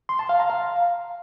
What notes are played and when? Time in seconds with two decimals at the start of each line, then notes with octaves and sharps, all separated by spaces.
0.09 C6
0.19 A5
0.29 F5
0.39 A#5
0.50 F5